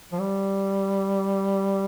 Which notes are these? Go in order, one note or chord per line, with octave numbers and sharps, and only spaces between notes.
F3
G3